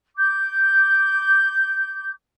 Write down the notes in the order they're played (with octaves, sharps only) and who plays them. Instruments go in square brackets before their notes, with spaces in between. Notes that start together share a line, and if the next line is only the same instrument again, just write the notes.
[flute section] D6 G6